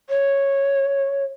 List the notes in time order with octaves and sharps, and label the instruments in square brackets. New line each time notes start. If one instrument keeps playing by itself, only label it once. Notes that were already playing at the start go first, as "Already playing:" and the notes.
[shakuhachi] C#5